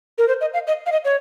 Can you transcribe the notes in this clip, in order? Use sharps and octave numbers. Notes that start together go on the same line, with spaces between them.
A#4
C5
D#5
F5
D#5
F5
D#5
C#5